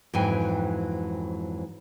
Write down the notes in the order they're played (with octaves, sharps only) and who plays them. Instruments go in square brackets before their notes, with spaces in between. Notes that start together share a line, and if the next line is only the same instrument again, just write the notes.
[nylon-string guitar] F2 G#2 E3 F#3 G5 G#5